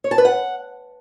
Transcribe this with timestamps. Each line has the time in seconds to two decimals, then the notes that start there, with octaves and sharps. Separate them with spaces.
0.04 C#5
0.11 A5
0.18 B4
0.25 F#5